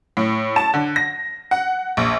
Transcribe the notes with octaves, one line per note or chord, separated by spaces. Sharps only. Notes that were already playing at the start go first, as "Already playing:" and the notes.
A2
A5
D3
A#6
F#5
A#1